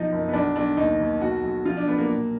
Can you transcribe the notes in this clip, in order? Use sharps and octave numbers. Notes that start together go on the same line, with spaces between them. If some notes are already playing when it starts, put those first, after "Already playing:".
Already playing: B1 F3 D#4
F#1
B3
B1 D4
B1 D4
D#2 D#4
D#2
B1 F#4
B1
F3 F4
D4
B1 B3
A#3
A#2